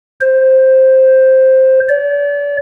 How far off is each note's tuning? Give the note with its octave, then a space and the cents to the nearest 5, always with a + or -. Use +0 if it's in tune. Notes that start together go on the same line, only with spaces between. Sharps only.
C5 +5
D5 -40